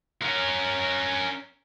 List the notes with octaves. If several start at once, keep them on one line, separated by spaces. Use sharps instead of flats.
C#4 A#4